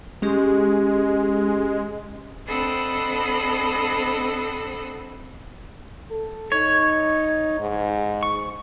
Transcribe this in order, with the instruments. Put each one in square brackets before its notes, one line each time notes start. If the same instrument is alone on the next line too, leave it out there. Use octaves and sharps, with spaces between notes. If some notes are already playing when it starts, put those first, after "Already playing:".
[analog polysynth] G#3 [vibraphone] C#4 G4
[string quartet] C4 D4 A4 D#5 F#5 B5
[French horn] A4
[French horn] D#4 [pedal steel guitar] C#5
[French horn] G#2
[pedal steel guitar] C#6